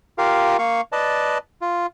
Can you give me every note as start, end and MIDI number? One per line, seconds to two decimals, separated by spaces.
0.18 0.57 65
0.18 0.57 67
0.18 0.57 70
0.18 0.57 77
0.59 0.81 58
0.59 0.81 77
0.59 0.81 85
0.92 1.38 71
0.92 1.38 74
0.92 1.38 75
0.92 1.38 81
1.61 1.86 65